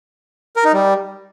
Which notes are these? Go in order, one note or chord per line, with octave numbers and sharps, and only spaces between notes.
A#4
D#4
G3